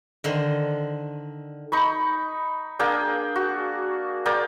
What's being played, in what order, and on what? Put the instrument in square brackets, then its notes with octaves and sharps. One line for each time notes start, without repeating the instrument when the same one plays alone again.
[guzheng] D3 D#3 C5
[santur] D#4 B5 C#6
A#3 D4 G#4 G5
F#4
G#4 A#4 D5 G5